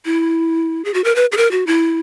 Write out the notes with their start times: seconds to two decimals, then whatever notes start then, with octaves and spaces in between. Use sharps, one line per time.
0.05 E4
0.85 G#4
0.94 F#4
1.04 A#4
1.16 B4
1.32 G#4
1.37 A#4
1.51 F#4
1.67 E4